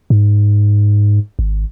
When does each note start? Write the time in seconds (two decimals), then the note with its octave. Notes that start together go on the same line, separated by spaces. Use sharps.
0.10 G#2
1.39 G#1